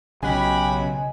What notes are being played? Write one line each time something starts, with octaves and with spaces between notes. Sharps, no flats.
B1 C#3 C#4 F#4 G4 D#5 G#5 B5